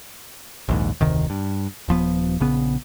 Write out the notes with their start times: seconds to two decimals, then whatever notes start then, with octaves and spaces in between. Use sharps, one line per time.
0.69 A#1 D#2 G#2
1.01 F1 D2 C3 D#3
1.30 G2
1.88 D#1 F3 B3
2.40 A#1 C#3 B3